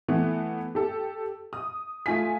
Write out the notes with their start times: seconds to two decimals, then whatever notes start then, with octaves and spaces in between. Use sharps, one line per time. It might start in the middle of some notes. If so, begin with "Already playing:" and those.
0.08 E3 A3 B3
0.75 G4 A4
1.53 D#6
2.06 A3 F4 G#5 B6